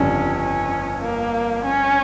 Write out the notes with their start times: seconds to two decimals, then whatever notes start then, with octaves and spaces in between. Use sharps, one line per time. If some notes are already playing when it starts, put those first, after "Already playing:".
Already playing: G1 F2 C#3 G3 C#4 D4
0.40 C#4
1.03 A#3
1.64 C#4